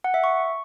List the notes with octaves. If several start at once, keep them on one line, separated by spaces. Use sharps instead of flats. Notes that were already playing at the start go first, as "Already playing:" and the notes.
F#5
E5
C#6